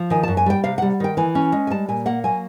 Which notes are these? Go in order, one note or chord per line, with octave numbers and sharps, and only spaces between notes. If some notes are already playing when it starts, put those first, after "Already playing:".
Already playing: F3
D#3 G#5
A5
F#2
G#5
G3 G5
C3 F5
F#5
G3
D#3 G5
E3 G#5
C#4
G#3
G#5
G3 A5
A#2 G#5
A#3 F#5
F#3 G#5